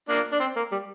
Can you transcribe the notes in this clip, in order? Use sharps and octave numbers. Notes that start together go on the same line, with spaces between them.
A#3 D4
D4
C4
A#3
G3